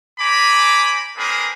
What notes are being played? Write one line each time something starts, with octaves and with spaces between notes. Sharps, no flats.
C5 G#5 A#5 B5 D6
A#3 C4 D4 G#4 A#4 B4